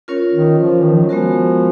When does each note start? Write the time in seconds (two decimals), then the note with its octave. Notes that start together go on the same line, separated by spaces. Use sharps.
0.08 C#4 F4 A#4 C#5
0.34 D#3
0.58 F3
0.84 D#3
1.03 F#3
1.09 F3 G#3 B3 F#4 A#4